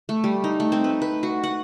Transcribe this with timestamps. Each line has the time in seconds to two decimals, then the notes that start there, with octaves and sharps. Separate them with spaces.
0.09 A3
0.24 G3
0.44 D#4
0.60 A3
0.72 C4
0.84 B4
1.02 B4
1.23 F#4
1.44 F#5